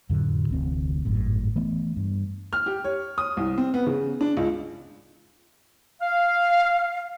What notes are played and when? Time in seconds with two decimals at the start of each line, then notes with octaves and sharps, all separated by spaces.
0.10 F2 A2 D3 F#3
0.49 F1 D2 E3 C4
1.05 G#1 F#2 A2
1.56 E3 A3 B3
1.96 G2
2.53 F6
2.66 G4
2.84 C#5
3.18 D#6
3.37 C2
3.58 C4
3.74 B3
3.87 C#3
4.21 D4
4.37 C#2
6.01 F5